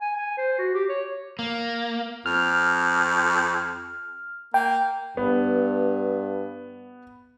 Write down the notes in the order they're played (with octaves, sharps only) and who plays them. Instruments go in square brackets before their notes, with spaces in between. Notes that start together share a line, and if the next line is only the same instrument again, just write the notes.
[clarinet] G#5
G#5
C5
F#4
G4
C#5
[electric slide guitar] A#3
[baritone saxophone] F2 [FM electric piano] F6
[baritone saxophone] A#3 [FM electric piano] G5
[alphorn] G2 [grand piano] B3